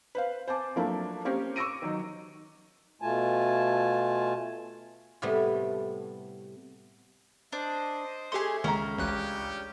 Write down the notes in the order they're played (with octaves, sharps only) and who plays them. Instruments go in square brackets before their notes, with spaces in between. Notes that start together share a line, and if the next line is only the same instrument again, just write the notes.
[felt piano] B4 C5 F5
C5 G#5 A5 D6
F3 F#3 A3 A#3 D4 E4
A#3 C4 C#4 G4 A#4 C5
C#6 D6 E6 A#6 D7 D#7
D#3 F#3 D#4
[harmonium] B2 A3 F4 G#5 A5
[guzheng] A2 C3 G3 A3 B3
[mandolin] D4 [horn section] C5 D#5
[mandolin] A3 G#4 [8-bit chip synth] G4 C6
[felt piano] C#2 A#5 [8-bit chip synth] D#3 [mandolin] C#4
[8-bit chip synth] A1 D2 F#6 [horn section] C#3 D4 G4